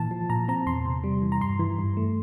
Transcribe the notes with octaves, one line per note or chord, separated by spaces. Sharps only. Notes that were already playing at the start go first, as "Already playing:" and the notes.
Already playing: A#2 E3 A5
F3
A#2 A#5
C4 A#5
E2 C6
C3
G3
E3
A#5
G2 C6
E3
G2
A3